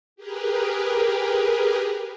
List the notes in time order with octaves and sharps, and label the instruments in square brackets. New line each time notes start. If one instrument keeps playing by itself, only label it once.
[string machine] G4 G#4 A#4 B4